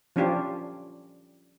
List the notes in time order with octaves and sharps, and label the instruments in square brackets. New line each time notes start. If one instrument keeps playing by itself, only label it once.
[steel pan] F3 C#4 D4 F4 G4